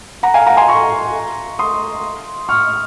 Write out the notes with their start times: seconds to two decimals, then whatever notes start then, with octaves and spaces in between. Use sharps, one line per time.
0.23 F#5 A#5
0.34 F5 G#5
0.46 F#5 A#5
0.57 G#5 C6
0.68 A#5 C#6
1.59 C6 D#6
2.49 C#6 F6